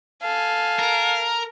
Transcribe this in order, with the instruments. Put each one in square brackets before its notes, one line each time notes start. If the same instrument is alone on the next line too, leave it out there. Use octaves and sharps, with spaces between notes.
[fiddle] A4 G#5 [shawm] F5
[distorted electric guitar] A#4